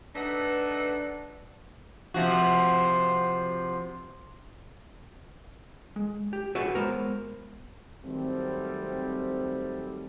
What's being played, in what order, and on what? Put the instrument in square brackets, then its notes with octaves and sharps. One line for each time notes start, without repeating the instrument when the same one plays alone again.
[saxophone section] A3 D#4 F#5 [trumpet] D4 [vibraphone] B4 E6
[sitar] C3 F3 F#4
[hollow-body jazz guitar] G#3
G4
F#4 G#4 B4 C#5 E5 F#5
G#3 B3 A#4 C5
[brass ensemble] D#3 F#3 G3 A3 C4